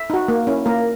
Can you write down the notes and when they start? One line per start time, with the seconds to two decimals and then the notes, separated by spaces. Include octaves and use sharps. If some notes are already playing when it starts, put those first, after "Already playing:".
Already playing: E5
0.10 D#4 F#4
0.28 A#3
0.47 C#4 E4
0.66 A#3 A#4